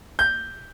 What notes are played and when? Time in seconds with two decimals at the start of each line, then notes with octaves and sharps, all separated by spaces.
0.19 G6